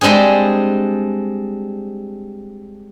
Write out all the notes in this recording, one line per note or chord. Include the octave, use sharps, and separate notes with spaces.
G3 G#3 C4 D4 G#4